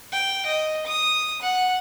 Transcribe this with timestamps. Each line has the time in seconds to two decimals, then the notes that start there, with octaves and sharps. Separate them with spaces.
0.12 G5
0.46 D#5
0.86 D#6
1.42 F#5